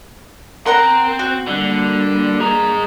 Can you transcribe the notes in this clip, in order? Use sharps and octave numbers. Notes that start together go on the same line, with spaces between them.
C4 A#4 F#5 A#5 C6
F#4
D3 G3 A#3 D4
G#4 A#5